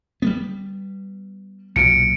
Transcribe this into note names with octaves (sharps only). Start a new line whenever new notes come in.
G3 G#3 B3
B1 A#2 F#3 C#7 D7